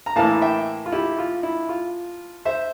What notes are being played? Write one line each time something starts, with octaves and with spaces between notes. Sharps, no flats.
A#5
A2 E3 A#3 E4 F5 A5
E5 G5
F4
E4 G4
F4
E4
F4
C5 E5